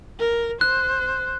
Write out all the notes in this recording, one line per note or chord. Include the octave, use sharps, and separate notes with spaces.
A#4
C5 F#6